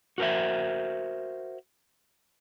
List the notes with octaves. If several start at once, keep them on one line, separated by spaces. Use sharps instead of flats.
F#4 A#4 C5 E5